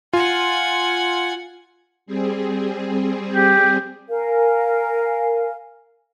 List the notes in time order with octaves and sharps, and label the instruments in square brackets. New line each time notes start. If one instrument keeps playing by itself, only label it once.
[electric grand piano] F4 [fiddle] F#5 G#5
[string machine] G3 C4 G#4
[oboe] G4
[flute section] A#4 F5 G#5